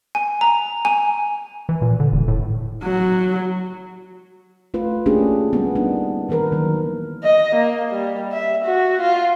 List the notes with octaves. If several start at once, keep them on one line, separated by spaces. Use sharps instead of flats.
G#5
A#5
G#5
E3
A#2
D3
E1
A2
F#3
A3 F4 B4
A3 A#3 C#4 D4 G4 G#4
G3 B3
A#3 D4 D#4
D#3 E3 A#3 A#4 B4
D#3 F#3
D#5
A#3
G3
E5
F#4
F4